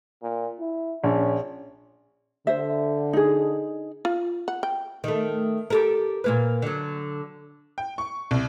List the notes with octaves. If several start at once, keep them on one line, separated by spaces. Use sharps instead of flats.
A#2
E4
A#1 C#4
D3 C5 E5
D#4 G#4
F4
F#5
G5
D#3 A3
G4 A4 A#4
A#2 A#3 B4
D3 F#3
G5
C#6
C2